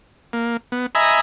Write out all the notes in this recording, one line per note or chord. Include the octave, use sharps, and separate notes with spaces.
A#3
B3
D#5 E5 G#5 A#5 B5